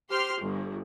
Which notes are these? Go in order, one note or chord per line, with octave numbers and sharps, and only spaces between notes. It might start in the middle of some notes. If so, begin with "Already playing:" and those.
G4 C5 C6 F6
G1